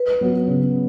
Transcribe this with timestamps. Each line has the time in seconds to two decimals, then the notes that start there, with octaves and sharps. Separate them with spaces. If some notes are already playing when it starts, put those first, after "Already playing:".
Already playing: B4
0.21 F#3 B3 F#4
0.47 C#3